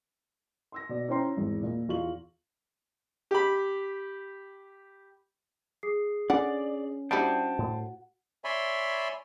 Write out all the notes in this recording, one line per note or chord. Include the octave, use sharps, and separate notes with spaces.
C6 E6 A#6
B2 D5
C#4 E4 C5 G5 A#5 C6
G#1 E2
A#2
E2 F4 C#6 F#7
G4 B5
G#4 D#6 C7
D3 C#4 D5 F#5
G3 D4 E4 F#4 C5 F#5 G5 A5
A2
C#5 D5 E5 G#5 B5 C6